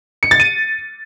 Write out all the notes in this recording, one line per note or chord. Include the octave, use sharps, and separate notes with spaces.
C#7
A6
D#7